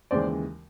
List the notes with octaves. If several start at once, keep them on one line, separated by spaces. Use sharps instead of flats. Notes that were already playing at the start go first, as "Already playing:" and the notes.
D#2 C#3 E3 G#3 C5 D5